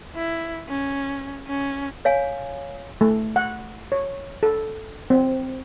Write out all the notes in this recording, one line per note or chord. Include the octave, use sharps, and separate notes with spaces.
E4
C#4
C#4
C#5 F5 G#5
A3
F#5
C#5
A4
C4